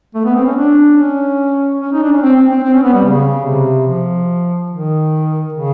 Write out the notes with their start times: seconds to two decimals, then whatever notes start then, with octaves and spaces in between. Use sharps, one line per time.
0.15 A3
0.25 B3
0.36 C4
0.46 C#4
0.56 D4
0.97 C#4
1.80 C#4
1.93 D#4
2.02 D4
2.12 C#4
2.22 C4
2.35 C4
2.49 C4
2.63 C4
2.74 C#4
2.83 B3
2.93 G3
3.04 C#3
3.45 C3
3.87 F3
4.70 D#3
5.53 C#3